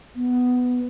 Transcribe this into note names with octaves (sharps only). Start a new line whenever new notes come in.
B3